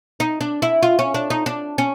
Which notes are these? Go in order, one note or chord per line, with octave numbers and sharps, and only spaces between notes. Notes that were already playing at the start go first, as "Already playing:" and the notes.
D#4
D4
E4
F4
C#4
D4
D#4
D4
C#4